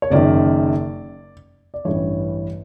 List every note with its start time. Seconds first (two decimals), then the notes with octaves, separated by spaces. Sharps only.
0.02 C#5
0.10 F#1 F#2 D#3 D5
1.74 D5
1.85 A1 G2 E3 C#5